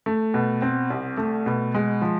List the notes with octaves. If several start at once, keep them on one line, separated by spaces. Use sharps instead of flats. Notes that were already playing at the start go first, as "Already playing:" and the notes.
A3
B2
C4
C2
A3
B2
G#3
F3